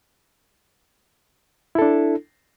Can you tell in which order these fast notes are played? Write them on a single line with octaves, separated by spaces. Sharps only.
E4 A4 D4